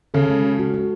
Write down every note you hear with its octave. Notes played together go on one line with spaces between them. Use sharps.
C#3 A4
G#3
F#4
F#4
F#4